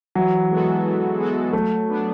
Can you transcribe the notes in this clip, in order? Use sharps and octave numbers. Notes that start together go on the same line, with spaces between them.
E3 F#3
G#3 B3 F#4 A4
E3
G#3 B3 F#4 A4
F#3 A3
B3 D4